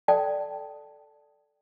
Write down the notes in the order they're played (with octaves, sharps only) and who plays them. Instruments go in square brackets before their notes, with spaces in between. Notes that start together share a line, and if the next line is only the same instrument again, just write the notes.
[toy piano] A4 D5 G5 A5